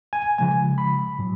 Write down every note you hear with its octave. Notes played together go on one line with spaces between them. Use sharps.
G#5
C#3 F3 G#3 G#5
B5
A2 F#3